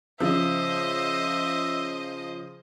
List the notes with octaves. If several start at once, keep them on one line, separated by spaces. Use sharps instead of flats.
C#3 F3 C5 D#5 E5